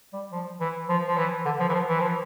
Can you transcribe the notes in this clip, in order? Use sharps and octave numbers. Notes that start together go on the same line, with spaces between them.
G3
F3
E3
F3
F3
E3
D3
F3
E3
F3
E3
F3